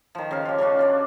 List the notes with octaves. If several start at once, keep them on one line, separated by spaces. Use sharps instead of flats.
D#3 F3
C#3 F5
F4 G4
C#3 D4 F4 F#4
C#4 D4 D5